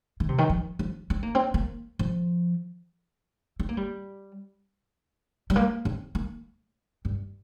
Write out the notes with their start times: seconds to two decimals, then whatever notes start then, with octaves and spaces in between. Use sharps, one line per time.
0.20 D#3
0.29 C3
0.38 D#3
0.50 F3
0.79 F3
1.10 C4
1.23 A#3
1.35 C4
1.54 A#3
1.99 F3
3.60 C4
3.69 A#3
3.77 G3
5.50 G3
5.56 A#3
5.85 C4
6.15 A#3
7.05 G2